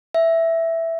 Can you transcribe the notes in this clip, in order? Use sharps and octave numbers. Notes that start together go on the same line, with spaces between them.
E5